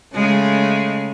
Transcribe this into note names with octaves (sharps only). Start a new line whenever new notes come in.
C#3 G#3 A3